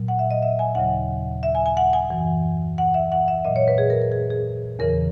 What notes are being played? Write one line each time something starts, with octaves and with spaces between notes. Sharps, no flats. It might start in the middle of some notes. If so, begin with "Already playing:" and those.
Already playing: A#2 F#3
F#5
E5
D#5
E5
G#5
D#2 C#3 F#3 F#5
E5
G#5
G#5
F#5
G#5
F#2 E3
F#5
E5
F#5
E5
A#2 F#3 D#5
C#5
B4
G#4
A#4
A#4
G#4
G#4
E2 C#3 E3 A#4